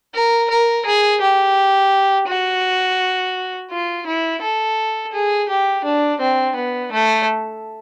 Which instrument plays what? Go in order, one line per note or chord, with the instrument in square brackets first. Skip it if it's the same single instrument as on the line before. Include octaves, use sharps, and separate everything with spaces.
[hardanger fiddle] A#4
A#4
G#4
G4
F#4
F4
E4
A4
G#4
G4
D4
C4
B3
A3